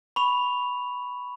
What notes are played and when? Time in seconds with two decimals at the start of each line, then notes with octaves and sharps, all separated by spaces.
0.16 B5 C#6 F7